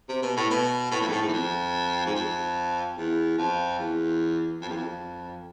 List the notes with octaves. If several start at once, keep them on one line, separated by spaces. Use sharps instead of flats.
C3
B2
A2
B2
A2
F2
G#2
A2
G#2
E2
F2
G#2
F2
E2
F2
E2
F2
E2
F2